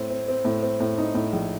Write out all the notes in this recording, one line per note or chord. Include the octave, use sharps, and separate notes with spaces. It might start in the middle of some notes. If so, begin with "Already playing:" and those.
Already playing: A2 C4
C4
C4
A2
C4
A2
D#4
A2
A#1